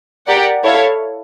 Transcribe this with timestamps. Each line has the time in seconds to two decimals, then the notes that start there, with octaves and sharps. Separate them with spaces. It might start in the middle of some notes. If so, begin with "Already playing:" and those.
0.27 G4 A#4 D5 F#5
0.63 E4 A4 C#5 F5